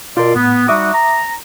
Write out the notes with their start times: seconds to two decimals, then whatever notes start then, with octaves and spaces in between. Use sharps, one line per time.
0.17 B2 F4 A#4 D5 C6
0.35 A2 B3
0.68 G3 D#4 F#4 E5 D6 D#6
0.94 A#5